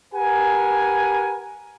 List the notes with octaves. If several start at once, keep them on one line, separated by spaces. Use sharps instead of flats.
G4 A#4 B4 F#5 G#5